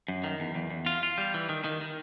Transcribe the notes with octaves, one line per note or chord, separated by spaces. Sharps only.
F#2
D#3
E2
E2
E2
F4
F4
G3
E3
D#3
D#3
D#3